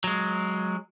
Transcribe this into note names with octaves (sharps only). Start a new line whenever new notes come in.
F#3 G#3